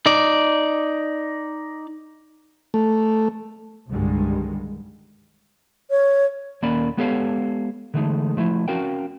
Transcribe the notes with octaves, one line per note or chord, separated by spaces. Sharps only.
D#4 D5
A3
C2 G2 D3 D#3 G3 G#3
C#5
D#2 A#3 C#4 A#4 D5 B5
G#3 B3 G4 A4 C#5 F5
D3 E3 G#3 A3 D#4
F3 A3 E4
C4 C#4 F#4 A#4 F5 G5